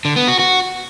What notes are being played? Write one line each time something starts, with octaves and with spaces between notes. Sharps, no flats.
D3
B3
F#4
F#4